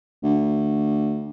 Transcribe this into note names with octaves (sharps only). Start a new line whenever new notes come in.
D2